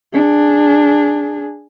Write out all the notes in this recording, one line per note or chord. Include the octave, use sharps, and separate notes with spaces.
D4 G#4